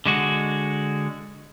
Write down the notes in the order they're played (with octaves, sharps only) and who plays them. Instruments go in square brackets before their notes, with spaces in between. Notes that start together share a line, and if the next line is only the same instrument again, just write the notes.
[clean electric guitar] D3 G#3 F#4